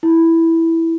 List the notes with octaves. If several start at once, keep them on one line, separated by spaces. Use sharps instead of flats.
E4